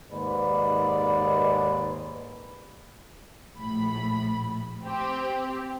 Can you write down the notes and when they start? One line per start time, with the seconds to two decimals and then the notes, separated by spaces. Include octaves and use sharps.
0.11 D#2 G#2 B4 D5
3.56 A#1 A2 B5
4.84 C4 G4